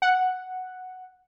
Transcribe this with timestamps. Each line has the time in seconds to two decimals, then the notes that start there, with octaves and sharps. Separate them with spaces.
0.02 F#5